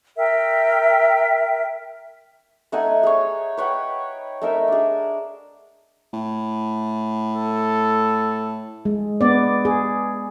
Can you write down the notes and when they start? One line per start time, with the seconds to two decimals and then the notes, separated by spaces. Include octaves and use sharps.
0.17 A#4 E5 G5
2.72 A3 D#4 F#5 G#5
3.03 G#4 C#5
3.57 B4 C#5 F#5 G5
4.41 A3 D#4 A#4 E5
4.68 D4 G#4
6.13 A2
7.35 A4
8.85 G#3
9.21 B3 D5
9.65 G#4